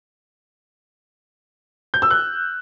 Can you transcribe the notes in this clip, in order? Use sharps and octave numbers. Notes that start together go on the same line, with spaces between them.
G6
E6
F#6